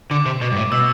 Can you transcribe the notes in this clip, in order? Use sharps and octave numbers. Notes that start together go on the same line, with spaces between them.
D3 D6
C3
B2
G2
A2
B2 E6